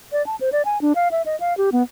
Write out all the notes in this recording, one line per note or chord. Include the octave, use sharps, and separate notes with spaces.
D5
A5
C5
D5
G#5
D4
F5
E5
D#5
F5
G4
B3